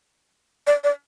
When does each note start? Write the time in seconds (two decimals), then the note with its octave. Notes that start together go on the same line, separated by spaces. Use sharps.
0.67 D5
0.84 D5